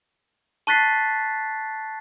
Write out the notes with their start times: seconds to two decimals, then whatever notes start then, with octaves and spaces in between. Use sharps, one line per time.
0.67 A5 C#6 F#6 A6 B6 C7